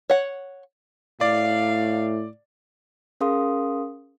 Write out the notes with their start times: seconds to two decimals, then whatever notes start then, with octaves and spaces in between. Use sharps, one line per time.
0.10 C#5 F#5
1.21 A2 D5 F5
3.21 C#4 G#4 A#4 F5 C6 D#6